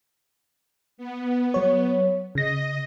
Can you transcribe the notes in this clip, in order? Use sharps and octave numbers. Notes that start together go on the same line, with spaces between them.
B3
F#3 C#5
C#3 D#5 A#6